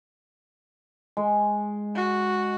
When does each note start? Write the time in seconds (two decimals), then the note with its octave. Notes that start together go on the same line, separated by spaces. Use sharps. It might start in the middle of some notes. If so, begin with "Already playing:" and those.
1.17 G#3
1.95 F#4